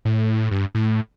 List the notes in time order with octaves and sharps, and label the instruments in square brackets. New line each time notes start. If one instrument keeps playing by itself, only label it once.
[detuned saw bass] A2
G2
A2